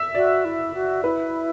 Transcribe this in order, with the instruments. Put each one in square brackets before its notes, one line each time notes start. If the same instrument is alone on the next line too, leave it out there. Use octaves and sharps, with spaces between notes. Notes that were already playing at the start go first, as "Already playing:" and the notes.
Already playing: [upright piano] E5
[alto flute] F#4 [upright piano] D5
[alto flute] E4
F#4
[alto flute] E4 [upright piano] B4